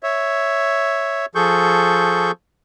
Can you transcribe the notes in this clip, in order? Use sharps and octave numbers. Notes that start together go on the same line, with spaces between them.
C#5 E5
F3 G#4 A4 C#6 G6